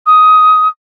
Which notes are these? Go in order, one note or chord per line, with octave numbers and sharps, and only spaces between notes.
D#6